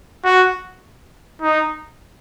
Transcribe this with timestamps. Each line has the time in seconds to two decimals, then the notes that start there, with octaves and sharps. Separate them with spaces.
0.25 F#4
1.42 D#4